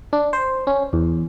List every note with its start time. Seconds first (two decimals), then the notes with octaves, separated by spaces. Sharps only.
0.13 D4
0.33 C5
0.67 C#4
0.93 E2